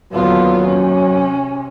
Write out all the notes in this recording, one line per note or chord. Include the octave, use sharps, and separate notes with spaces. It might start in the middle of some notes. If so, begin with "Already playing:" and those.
D#2 D3 F#3 B3 F4
C3 C#4